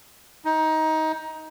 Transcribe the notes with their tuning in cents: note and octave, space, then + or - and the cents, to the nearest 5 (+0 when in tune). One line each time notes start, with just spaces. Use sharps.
D#4 +20